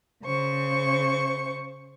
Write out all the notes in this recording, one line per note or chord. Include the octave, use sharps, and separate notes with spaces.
C#3 C5 C#6